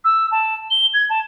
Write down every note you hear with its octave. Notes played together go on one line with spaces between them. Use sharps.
E6
A5
G7
G#6
A5